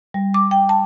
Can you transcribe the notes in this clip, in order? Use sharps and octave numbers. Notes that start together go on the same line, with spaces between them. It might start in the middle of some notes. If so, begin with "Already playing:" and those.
G3
D6
G5
A5